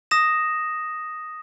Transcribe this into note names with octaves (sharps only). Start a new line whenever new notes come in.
D#6 A#6 E7